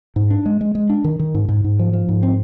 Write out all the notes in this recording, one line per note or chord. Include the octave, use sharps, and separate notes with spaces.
G#2
D4
G#3
G#3
G#3
D4
D#3
D#3
G#2
G#2
G#2
F3
F3
G#2
C4